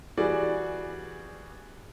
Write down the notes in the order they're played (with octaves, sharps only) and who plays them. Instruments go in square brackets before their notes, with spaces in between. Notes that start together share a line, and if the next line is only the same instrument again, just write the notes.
[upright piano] E3 G3 F#4 G#4 D5